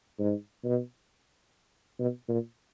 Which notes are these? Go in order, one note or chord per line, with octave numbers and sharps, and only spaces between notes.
G#2
B2
B2
A#2